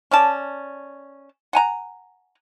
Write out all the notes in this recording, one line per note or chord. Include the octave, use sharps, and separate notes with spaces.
C#4 D5 A5
F#5 G#5 A#5